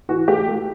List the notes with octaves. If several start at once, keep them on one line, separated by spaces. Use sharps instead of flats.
E3 F#4
A3 G4
A3